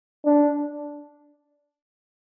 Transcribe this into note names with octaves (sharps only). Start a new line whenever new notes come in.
D4